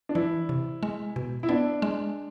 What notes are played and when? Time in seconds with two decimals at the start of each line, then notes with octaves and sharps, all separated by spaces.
0.09 D4
0.15 E3 E4
0.49 C3
0.83 G#3
1.16 B2
1.43 E4
1.49 B3 D4
1.82 G#3